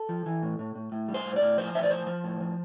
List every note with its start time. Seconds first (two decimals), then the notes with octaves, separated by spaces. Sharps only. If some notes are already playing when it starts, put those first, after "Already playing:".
Already playing: A4
0.09 F3
0.26 E3
0.43 A2
0.59 A2
0.76 A2
0.92 A2
1.08 G3
1.14 C5
1.25 A2
1.36 D5
1.41 A2
1.58 F3 C5
1.74 A2 E5
1.83 D5
1.90 F3 C5
2.07 F3
2.24 A2
2.40 F3